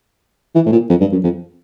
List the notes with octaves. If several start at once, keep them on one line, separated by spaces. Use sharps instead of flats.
E3
A2
A#2
F2
G2
F#2
F2